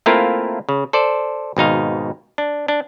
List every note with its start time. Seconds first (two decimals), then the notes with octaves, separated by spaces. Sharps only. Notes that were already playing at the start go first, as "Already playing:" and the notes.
0.06 A3 A#3 C4 E4 F4 A#4
0.69 C#3
0.93 A4 C5 D5
1.57 G#1 B2 D#4 F5
2.38 D4
2.68 D4